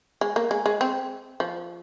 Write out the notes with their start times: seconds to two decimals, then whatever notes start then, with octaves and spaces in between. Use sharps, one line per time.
0.21 G#3
0.36 A#3
0.51 G#3
0.66 G#3
0.81 C4
1.40 F3